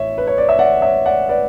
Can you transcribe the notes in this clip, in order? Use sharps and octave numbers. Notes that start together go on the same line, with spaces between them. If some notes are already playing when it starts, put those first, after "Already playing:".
Already playing: A1 C#5 E5
B4
C#5
D5
E5
D5 F#5
C#5 E5
D5 F#5
B4 D5